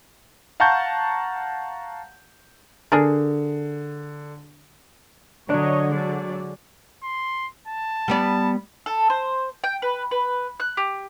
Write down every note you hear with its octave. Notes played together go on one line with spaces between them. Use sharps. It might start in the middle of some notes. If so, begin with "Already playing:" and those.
F5 F#5 A5 A#5 C#6 G6
D3 D4 G#4 A#4
D3 F#3 D4 C#5 D#5
F#3 G#3 D5
C6
A5
G3 B3 D5
A4
C5
G5
B4
B4
F#6
G4